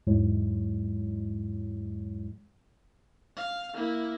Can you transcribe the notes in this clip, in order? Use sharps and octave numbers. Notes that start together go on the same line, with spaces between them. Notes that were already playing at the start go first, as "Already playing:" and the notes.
E2 G#2 F#3 G#3 E4 C#5
F5
A#3 E4